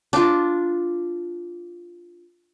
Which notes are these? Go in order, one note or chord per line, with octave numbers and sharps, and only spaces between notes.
D4 F4